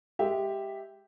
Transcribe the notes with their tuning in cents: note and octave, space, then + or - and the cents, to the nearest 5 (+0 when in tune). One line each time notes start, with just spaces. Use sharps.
G#3 +0 G4 +0 E5 +0